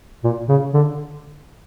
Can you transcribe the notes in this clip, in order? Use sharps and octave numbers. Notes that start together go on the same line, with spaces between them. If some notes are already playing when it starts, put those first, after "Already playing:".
A#2
C#3
D3